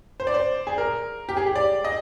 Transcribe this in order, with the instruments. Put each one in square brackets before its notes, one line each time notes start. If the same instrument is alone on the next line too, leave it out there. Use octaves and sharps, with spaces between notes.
[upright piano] C5
D5
C5
G#4
A#4
G4
G#4
G4
D5
D#5